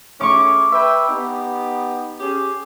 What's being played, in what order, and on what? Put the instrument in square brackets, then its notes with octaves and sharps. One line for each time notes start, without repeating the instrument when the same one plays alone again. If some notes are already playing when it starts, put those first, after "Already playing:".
[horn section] A3 C#4 G#4 [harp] C#6 D6
[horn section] B4 E5 G5
B3 D#4 G4
C#4 G4 G#4